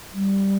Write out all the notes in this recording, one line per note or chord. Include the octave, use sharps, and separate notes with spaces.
G3